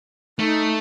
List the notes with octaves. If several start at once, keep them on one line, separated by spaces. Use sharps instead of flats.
A3 D#4